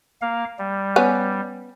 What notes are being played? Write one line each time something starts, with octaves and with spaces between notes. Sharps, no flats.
A#3 F5
G3
B3 C#4